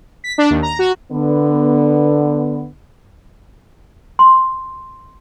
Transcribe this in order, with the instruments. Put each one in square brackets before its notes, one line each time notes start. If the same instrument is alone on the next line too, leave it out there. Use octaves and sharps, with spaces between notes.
[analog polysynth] B6
D4
D#2
A#5
F#4
[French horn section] D3 B3
[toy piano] C6